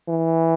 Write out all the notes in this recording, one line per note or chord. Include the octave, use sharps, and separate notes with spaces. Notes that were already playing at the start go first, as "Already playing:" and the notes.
E3